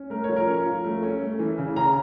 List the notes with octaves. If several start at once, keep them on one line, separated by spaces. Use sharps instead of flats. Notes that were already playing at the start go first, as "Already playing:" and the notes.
Already playing: C#4
A3 A#4
C#5
F3
A#4
C#4
F3
A3
C#4
A3
E3
C#3
C#3 A#5